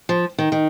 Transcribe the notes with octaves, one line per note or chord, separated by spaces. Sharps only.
F3
D#3
D#3